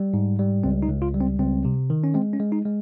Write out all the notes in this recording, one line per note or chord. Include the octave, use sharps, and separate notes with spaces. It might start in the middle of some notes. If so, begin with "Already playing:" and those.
Already playing: G3
G#2
G3
C#2 C4
D#4
C#2
F4
G3
C4
C#2 C4
C3
D#3
C#4
G#3 C4
C#4
G#3
D#4
G#3